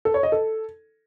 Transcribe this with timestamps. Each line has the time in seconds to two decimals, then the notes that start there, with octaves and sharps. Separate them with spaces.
0.05 A4
0.14 C#5
0.23 D#5
0.32 A4